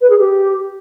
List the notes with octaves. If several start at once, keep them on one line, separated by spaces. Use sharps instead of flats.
B4
G#4
G4